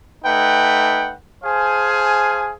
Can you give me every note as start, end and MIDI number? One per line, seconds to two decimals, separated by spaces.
0.25 1.14 57
0.25 1.14 63
0.25 1.14 71
0.25 1.14 78
0.25 1.14 79
1.43 2.53 68
1.43 2.53 72
1.43 2.53 77
1.43 2.53 80
1.43 2.53 81